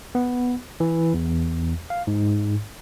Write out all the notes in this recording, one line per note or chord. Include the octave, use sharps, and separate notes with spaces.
B3
E3
E2
F5
G#2